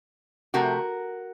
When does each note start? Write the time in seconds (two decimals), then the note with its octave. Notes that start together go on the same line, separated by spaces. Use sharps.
0.54 C3 F3 A3 F#4 A#4